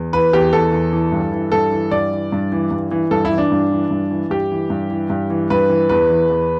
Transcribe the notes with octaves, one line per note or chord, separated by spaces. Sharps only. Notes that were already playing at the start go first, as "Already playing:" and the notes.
Already playing: E2
E3 B4
E2 G4
E3 A4
E2
E3
G2
E3
G2 A4
E3
G2 D5
E3
G2
E3
G2
E3
G2 A4
E4
E3
D4
G2
E3
G2
E3
G2 G4
E3
G2
E3
G2
E3
G2 B4
E3
E2 B4
E3
E2